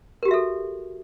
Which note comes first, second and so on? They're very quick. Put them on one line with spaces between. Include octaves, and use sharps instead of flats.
A#4 G4 F#4 E5 A4